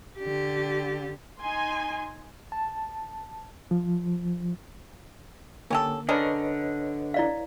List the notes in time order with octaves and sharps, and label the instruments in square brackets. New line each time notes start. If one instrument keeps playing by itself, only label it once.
[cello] D3 G4
[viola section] D#4 G#5 C6
[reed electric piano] A5
F3
[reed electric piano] D3 A#3 [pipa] C#4 G4 A4
[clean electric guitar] D3 [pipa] C#4 D4 A#4 [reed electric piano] B4 C#5 D#5
[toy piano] E4 D5 F5